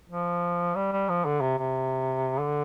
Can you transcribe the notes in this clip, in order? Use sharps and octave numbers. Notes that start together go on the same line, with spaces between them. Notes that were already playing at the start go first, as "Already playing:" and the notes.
F3
G3
G3
F3
D3
C3
C3
D3